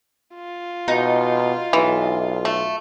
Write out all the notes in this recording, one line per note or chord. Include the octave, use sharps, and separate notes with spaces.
F4
B2 D#4
B1 E3
A3